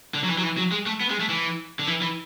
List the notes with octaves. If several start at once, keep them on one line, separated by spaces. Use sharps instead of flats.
D3
F#3
E3
F#3
E3
F#3
G#3
A3
B3
G#3
A3
E3
D3
E3
E3